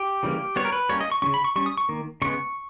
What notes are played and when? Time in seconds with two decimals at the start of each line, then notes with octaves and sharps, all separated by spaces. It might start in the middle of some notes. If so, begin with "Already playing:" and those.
Already playing: G4
0.23 C#3 E3 G3 A#3
0.56 G3 B3 C#5
0.65 A#4
0.73 B4
0.89 G3 A#3 C#4 C#5
1.01 D#5
1.12 C#6
1.22 C#3 G3 C#4 C#6
1.34 B5
1.44 C#6
1.56 G3 C#4 C#6
1.66 D#6
1.77 C#6
1.89 D#3 A#3
2.22 C#3 G#3 B3 C#6